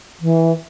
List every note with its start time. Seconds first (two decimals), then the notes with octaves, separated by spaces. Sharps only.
0.21 E3